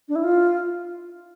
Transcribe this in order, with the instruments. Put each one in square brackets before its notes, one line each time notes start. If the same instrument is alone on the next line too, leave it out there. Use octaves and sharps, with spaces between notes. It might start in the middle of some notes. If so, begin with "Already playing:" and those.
[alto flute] D4
E4
F4